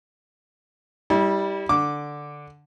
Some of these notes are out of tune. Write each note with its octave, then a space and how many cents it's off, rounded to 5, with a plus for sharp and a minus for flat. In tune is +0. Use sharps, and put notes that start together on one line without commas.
G3 +0 E4 -30
D3 +0 D6 +0